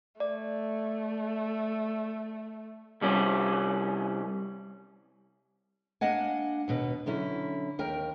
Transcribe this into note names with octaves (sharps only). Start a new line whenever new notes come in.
A3 D5
C2 G3 C#4
A#3 D4 D#5 F#5 G#5
D#2 B2 B4
D3 F#3 C#4 E4
D#2 A#4 G5